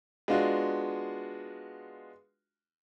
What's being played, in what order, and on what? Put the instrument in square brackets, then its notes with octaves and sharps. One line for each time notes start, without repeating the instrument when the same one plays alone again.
[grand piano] G#3 B3 D4 F4 F#4